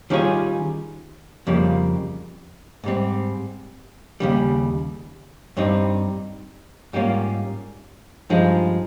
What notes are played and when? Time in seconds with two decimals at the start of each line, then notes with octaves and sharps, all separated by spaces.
0.10 D#3 G3 C#4 F4 G#4
1.47 F2 C#3 G3 A#3
2.84 G#2 G3 C4
4.20 D#2 C#3 G3
5.57 G2 G3 C4 D#4
6.93 G#2 G3 A#3 C#4 F4
8.30 G2 F3 G#3 D#4